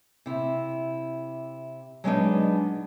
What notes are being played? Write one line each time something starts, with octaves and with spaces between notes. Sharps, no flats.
C3 E4
F#3 G#3 B3 C4 D4 D#4